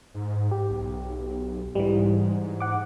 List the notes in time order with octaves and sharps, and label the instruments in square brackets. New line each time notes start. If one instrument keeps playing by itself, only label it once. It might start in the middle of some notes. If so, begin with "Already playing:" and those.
[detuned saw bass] G#2
[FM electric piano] G4
[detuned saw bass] B1
[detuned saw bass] G#2 [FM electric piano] E3 G3
[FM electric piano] F#5 D6